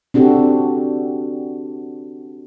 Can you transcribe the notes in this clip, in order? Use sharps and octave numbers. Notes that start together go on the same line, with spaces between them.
C4 D4 F#4 G4 A4